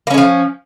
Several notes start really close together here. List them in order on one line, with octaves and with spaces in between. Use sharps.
A#3 C#4 G#3 F3